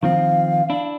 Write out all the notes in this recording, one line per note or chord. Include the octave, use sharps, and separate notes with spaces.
D#3 F3 C4 F5
D4 E4